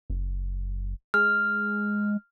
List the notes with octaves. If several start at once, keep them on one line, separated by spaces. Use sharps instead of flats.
F#1
G#3 F6